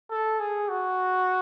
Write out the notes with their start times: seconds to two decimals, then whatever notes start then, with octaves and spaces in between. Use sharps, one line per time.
0.10 A4
0.39 G#4
0.69 F#4